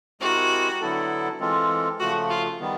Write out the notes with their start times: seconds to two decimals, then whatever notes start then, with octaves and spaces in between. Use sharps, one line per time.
0.21 G#3 C4 E4 F#4 G4 A#4
0.81 D3 F#3 B3 E4 A4
1.40 E3 G#3 C4 F4 A4
2.00 C#3 F3 A3 F#4
2.30 F4
2.60 D#3 G3 B3